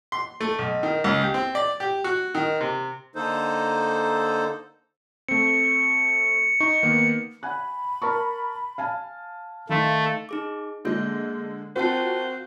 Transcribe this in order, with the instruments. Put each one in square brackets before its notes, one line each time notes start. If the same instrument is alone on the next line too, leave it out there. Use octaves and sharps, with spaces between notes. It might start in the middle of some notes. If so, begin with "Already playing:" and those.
[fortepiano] C6
A3
B1
D#3
C#2
G4
C4
D5
G4
F#4
D#3
C3
[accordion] D3 A#3 D#4 A4 C5
[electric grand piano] A3 C4 [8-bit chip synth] C#7
[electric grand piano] D#4 C#6
D#3 A#3 B3
[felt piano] F#5 G#5 F#6 [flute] B5
[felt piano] A#4 A5 C#6
F5 G#5 A5
[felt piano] D#3 C6 B6 [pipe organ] A3 [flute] F5
[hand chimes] D#4 G#4 D6
[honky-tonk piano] D3 G#3 [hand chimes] A#3 G#4 G6
[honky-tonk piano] C4 F4 F#4 [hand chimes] A#4 G5 A5 [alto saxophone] C5